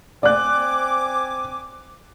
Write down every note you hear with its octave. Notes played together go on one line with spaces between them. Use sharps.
C4 D5 G#5 D6 F#6